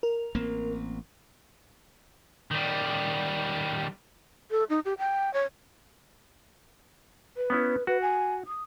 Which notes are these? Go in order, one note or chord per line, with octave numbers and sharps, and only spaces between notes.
A#4
A1 A#3 C4
D#3 G3
A4
D#4
G4
G5
C#5
B4
B3 C#4 E4
F#4 B4
G#5
D#6